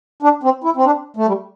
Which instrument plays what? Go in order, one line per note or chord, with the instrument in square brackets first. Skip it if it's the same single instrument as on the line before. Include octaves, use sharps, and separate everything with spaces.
[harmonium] D4
C4
E4
C4
D4
A3
G3